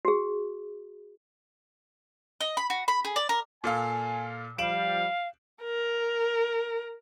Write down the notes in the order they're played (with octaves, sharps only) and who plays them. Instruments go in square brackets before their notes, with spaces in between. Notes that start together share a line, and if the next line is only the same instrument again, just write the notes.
[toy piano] F#4 G#4
[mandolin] D#5
B5
F#4
B5
G#4
D5
A#4
[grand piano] A#2 A4 F5 [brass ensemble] G#5
[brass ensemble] F3 G3 [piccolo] F5 [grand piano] D7 E7 F#7
[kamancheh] A#4